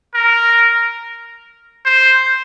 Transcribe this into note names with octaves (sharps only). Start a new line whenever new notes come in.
A#4
C5